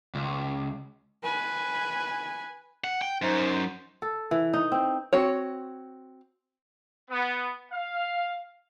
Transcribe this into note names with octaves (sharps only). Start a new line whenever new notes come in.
C#2
B4 G#5
F#5
G5
F#2 D#4 C5
A4
E3
D#4
C4
C4 F#4 C#5
B3
F5